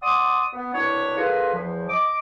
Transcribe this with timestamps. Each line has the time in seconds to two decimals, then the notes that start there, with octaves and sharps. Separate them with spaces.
0.02 D5 F#5 C6 D#6
0.53 B3
0.74 C2 B2 D4 E4 C#5
1.17 D3 F3 F4 G#4 A#4 B4
1.54 E2 F3
1.89 D#5 D6